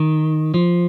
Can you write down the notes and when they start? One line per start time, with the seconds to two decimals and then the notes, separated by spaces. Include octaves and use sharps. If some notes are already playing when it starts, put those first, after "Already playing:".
Already playing: D#3
0.54 F3